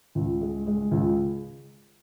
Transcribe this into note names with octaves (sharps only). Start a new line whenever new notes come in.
C#2
G#3
G#3
C#2